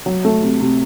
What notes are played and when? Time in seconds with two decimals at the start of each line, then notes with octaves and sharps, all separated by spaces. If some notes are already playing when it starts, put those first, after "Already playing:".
0.06 F#3
0.25 A3
0.42 C3
0.60 C3